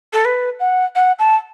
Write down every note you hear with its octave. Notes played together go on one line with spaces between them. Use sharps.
A4
B4
F#5
F#5
A5